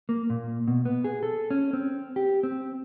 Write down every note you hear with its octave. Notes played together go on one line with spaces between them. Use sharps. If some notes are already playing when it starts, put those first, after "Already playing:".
A#3
A#2
B2
B3
G#4
A4
C#4
C4
G4
C4